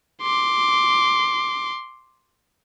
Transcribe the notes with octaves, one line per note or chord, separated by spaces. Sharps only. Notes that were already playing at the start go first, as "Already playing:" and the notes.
C6 D6